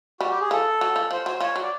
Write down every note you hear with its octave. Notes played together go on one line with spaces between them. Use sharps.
G3 F#4
G4
G#4
F3 A4
F#3
F3
F3 C5
F#3 C5
F3 C#5
F#3
D5